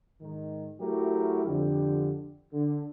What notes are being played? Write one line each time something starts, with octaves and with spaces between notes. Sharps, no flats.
G#2 D#3
F#3 A3 E4 F#4 G4 A#4
F2 D3 G4
D3